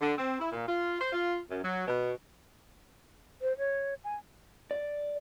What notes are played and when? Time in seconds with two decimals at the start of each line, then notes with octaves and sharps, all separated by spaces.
0.01 D3
0.18 C4
0.39 E4
0.52 A#2
0.67 F4
1.01 C5
1.12 F4
1.50 F#2
1.64 F#3
1.87 B2
3.42 C5
3.58 C#5
4.04 G#5
4.71 D5